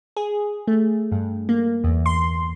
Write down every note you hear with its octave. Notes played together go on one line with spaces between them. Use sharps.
G#4
A3
G2
A#3
E2
C6